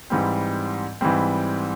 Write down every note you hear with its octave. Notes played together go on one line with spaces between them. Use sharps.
G#2 E3 G3 C4
G#2 E3 G3 C4